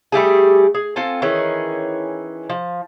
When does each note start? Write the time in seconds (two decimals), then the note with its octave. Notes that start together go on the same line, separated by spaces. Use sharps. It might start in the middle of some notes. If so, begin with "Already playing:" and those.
0.12 G3 A3 G4 G#4
0.75 G#4
0.96 C4 F4 A4 G#5
1.22 D#3 E3 C#4 G#4
2.50 F3